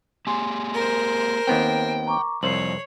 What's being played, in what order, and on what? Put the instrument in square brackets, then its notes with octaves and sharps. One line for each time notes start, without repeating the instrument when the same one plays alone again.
[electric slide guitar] A#3 G4 G#4 [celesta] G#5 C6
[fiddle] A#4 C5
[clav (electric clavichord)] D#2 B3 C4 [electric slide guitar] G5
[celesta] A#5 C#6 D6
[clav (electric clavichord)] C2 C5 [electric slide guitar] F2 [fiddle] C#5 [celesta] C7 F#7